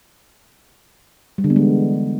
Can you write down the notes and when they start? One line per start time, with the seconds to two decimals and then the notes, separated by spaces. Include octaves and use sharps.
1.38 G3
1.44 D3
1.50 B3
1.56 G#3
1.62 E3